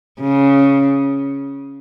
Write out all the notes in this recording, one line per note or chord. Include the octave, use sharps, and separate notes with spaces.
C#3